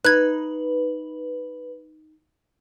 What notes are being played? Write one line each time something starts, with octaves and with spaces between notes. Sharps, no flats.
D#4 B4 F#6 G#6